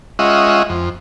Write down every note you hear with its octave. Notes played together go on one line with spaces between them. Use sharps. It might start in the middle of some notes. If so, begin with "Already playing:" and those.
G#3 C#4 F4 D#5 E5 F#5
F2